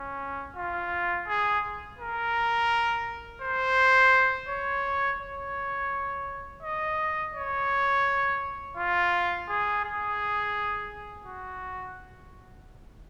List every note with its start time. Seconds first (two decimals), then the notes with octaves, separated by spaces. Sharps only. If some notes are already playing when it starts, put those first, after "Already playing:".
Already playing: C#4
0.56 F4
1.27 G#4
1.99 A#4
3.42 C5
4.49 C#5
5.21 C#5
6.63 D#5
7.34 C#5
8.77 F4
9.49 G#4
9.85 G#4
11.26 F#4